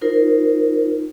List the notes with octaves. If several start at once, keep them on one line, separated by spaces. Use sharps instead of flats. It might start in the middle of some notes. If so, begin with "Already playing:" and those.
D#4 F4 A#4 C5